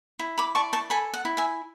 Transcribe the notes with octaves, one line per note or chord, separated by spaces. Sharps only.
E4
B5 D6
D5 A5 C#6
A5 C#6
A4 G#5 B5
F#5
E4
E5 G#5